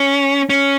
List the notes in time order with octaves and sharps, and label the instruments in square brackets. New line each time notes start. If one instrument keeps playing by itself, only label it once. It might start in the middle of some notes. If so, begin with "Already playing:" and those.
Already playing: [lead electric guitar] C#4
C#4